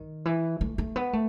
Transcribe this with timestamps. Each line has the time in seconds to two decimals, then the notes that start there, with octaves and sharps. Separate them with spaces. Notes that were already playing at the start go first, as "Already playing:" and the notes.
Already playing: D#3
0.25 E3
0.61 A3
0.78 A3
0.96 B3
1.13 A3